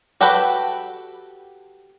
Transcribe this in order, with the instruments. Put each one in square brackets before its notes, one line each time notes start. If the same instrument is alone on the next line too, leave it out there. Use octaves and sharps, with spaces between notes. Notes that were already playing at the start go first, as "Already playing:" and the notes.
[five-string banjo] F#4 G4 A4 B4 B5